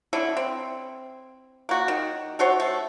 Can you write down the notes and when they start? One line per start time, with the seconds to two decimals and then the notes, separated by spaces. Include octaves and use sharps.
0.13 D3 C#4 E4
0.37 C4
1.69 A#3 F#4
1.88 D#3
2.39 A3 F#4 C5 C#5
2.60 A3